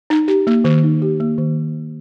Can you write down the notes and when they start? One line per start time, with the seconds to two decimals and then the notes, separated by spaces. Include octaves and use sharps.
0.10 D#4
0.28 G4
0.47 A#3
0.64 D#3
0.83 D#4
1.02 G4
1.20 A#3
1.38 D#3